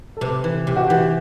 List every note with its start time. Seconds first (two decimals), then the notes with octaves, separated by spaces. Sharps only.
0.17 A4
0.21 C3 B4
0.44 E3
0.66 C3 G4
0.76 F#4
0.87 E3 G4